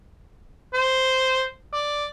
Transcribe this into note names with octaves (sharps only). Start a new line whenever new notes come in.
C5
D5